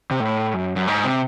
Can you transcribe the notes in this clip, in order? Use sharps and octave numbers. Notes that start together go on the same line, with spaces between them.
C3
A2
F#2
F#2
G#2
C3